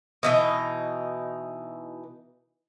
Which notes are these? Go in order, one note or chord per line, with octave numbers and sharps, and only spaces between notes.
B2 E3 D#4